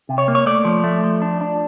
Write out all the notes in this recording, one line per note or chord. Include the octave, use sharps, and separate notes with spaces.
C3
C#5
A#3
C#5
A3 D5
F3
A3
F3
D4
D4